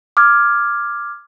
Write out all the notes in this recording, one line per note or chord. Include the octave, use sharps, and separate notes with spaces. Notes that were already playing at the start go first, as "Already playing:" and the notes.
D6 F6 G#6